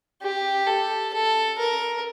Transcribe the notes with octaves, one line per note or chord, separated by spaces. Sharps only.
G4
A4
A4
A#4